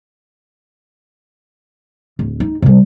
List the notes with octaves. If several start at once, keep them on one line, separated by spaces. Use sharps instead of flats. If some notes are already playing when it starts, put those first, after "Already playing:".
D1
D#4
C3 G3